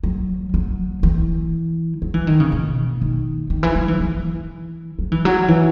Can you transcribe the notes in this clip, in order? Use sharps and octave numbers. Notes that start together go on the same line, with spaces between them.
F#3
F#3
E3
F#3
E3
D#3
C#3
B2
D#3
D#3
E3
F#3
E3
E3
F#3
E3
F#3
E3